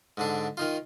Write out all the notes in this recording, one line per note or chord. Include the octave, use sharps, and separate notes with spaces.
G#2 D3 D4
D#3 D#4 F4